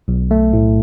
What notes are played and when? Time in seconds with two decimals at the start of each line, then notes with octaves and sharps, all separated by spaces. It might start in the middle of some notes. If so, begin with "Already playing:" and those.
0.08 B1
0.31 A3
0.53 A2